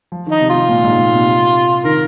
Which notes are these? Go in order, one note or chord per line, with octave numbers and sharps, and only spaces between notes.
F3
D#3 D#4
C3
F4
C3
A#2
G#2
A#2
C3
C3
D#3 A#4